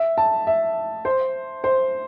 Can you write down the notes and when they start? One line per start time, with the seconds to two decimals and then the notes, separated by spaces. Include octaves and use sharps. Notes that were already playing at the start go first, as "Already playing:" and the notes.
Already playing: E5
0.18 A5
0.47 E5
1.05 C5
1.64 C5